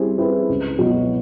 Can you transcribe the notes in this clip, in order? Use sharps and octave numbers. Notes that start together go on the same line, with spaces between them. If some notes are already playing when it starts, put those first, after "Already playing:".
Already playing: G3 C4 E4 G#4
C4 E4 G#4 B4
C#2
B2 F#3 B3 E4